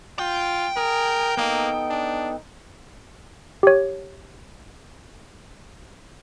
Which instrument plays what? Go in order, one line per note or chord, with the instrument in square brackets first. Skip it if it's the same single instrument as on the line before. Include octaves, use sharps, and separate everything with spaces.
[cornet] F4 [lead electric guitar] G5
[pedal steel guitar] G#4 [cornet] A#4
[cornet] A#3 [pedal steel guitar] B3 D#4 A4
[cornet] D4
[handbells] G4 C#5